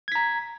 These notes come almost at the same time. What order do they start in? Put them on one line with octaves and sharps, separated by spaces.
G#6 B6 A#5